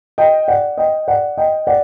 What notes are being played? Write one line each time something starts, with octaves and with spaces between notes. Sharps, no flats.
D#5 G5
D5 F#5
D#5 G5
D5 F#5
D#5 G5
D5 F#5